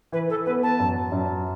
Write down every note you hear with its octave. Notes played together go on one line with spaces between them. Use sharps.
E3 B4
A4
B3 B4
A5
F#2
F#2